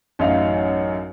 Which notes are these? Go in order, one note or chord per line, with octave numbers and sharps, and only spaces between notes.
A1 F#2 D#4 E5 F5 F7